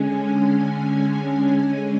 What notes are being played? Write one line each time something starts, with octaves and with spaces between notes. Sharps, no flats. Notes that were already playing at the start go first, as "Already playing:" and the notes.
Already playing: D3 G#3 C#4 G#5
G#5